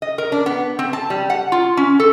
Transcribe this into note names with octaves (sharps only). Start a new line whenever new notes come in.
D#5
A#4
D4
B3
C4
A5
G3
F#5
F4
C#4
A4